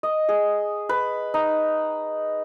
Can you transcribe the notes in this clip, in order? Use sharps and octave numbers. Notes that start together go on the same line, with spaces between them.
D#5
G#4
B4
D#4